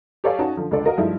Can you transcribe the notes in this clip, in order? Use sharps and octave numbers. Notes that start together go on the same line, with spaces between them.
G4 A4 C#5 D5 F5 G#5
C#4 D#4 F#4 C#5 A5
D3 F3
C#2 D3 A4 D5
F#4 A#4 D#5 F5
G2 F3 G#3 A3 D#4 E4